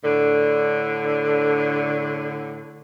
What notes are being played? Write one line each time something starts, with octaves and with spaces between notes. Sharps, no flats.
A2 D3